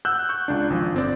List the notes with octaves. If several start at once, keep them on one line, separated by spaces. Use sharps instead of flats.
F#5 E6 F#6 G6
C#6 G6
C#2 D4
G#1 F3
G1 C4 D5